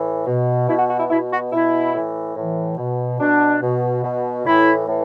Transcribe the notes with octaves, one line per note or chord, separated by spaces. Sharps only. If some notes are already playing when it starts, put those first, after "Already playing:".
Already playing: A2 E3
B2
B2 E4
F#4
F#4
E4
B2 E4
F#4
B2 E4
A2 E3
A2 E3
B2
B2 D4
B2
B2
A2 E3 E4
A2 E3